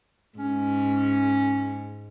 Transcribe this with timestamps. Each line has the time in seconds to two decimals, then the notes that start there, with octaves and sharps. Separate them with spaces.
0.38 G#2 C#4